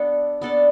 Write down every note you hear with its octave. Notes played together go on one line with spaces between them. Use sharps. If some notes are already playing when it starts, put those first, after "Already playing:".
Already playing: B3 D4 G4 A4 D5
B3 D4 A4 D5